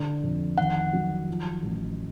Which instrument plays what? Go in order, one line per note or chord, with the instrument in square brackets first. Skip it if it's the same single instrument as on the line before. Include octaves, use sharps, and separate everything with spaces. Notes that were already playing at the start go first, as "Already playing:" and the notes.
Already playing: [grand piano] D3
F2
[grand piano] D#3 [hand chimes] F#5
[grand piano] F#3
F3
A1